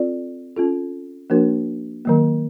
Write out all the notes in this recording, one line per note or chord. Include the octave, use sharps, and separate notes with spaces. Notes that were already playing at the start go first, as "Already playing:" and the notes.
Already playing: C4 F4 A4 D5
C#4 F4 A4
F3 A#3 D4 F#4 A#4
D#3 F#3 A#3